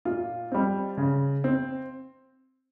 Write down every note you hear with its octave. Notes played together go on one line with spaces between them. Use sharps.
A#2 F4
G3 C4
C#3
C4